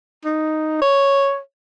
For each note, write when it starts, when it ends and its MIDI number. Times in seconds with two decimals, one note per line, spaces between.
0.25 0.79 63
0.81 1.38 73